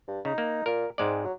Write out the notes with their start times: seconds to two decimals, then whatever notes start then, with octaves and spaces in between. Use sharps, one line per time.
0.07 G2
0.25 C#3 D#4
0.38 A#3
0.66 A#2 A#4
0.98 G#2 G#3 C4 D5
1.24 F#3